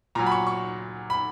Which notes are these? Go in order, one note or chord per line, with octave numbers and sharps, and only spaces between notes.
A#2 F#3 A#5
B5
C#6
C#6
B5